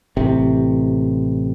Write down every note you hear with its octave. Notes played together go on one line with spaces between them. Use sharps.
A1 C3